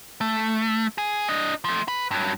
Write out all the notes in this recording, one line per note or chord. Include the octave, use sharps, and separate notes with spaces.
A3
G#4
D4 D#5
F3 A3
B4
G2 F#3